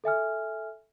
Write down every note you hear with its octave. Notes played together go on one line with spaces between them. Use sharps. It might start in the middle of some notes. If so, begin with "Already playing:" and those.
A4 E5 G#5 F6